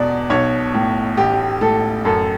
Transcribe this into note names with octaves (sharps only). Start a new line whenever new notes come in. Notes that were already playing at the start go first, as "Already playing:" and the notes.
Already playing: E2 B2 D5
B1 C#5
A2
A1 G4
A2 A4
F#2 A4